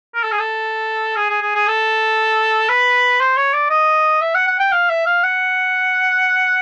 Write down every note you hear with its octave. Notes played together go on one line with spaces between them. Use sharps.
A#4
A4
G#4
A4
G#4
G#4
G#4
G#4
A4
B4
C5
C#5
D5
D#5
E5
F#5
F#5
G5
F5
E5
F5
F#5